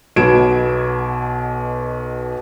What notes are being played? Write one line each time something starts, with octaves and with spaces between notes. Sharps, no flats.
B1 B2 B3 G#6 D7 E7